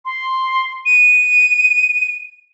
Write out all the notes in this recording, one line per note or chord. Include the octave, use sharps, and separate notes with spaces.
C6
D#7